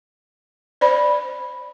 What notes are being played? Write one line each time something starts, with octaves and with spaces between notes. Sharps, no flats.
C5 D5 B5